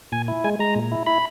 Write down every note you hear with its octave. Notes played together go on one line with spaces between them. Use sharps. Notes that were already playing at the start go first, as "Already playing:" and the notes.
A#2 G#5
E4
G#3 G#5
G#3 A#5
A#2
E4
E4 B5